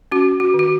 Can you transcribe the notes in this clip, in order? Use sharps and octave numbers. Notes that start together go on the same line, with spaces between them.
C#4 F#4
F#4
D#3
F#4